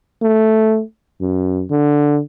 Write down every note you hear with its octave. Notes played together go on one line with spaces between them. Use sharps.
A3
F#2
D3